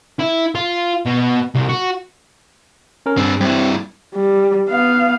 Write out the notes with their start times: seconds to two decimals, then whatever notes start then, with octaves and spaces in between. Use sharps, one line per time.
0.20 E4
0.55 F4
1.06 B2
1.55 C2
1.69 F#4
3.06 C#4 A#4
3.17 G2 C4 G#4
3.41 G2 C4 E4
4.14 G3
4.69 B3 F5